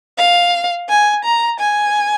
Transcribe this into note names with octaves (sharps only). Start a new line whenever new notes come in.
F5
G#5
A#5
G#5